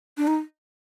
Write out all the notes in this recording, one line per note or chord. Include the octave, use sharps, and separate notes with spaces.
D4
D#4